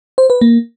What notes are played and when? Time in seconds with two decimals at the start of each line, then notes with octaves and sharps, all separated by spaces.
0.18 C5
0.30 B4
0.41 A#3